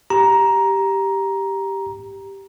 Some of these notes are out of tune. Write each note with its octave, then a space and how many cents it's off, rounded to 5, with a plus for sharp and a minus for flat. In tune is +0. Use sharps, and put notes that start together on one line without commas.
G4 +0 A#5 +10